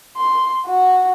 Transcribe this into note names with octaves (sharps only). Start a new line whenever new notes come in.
C6
F#4